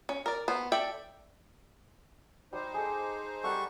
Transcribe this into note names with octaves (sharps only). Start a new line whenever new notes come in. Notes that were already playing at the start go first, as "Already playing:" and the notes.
C#4
A#4 D5
B3 C5
A4 D5 E5 G5
G3 D#4 C5
G#4 A4 D6
G3 A4 F#5 A#5 C#6